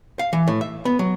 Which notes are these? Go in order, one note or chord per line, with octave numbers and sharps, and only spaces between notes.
F5
E3
A2
E5
B3
F#3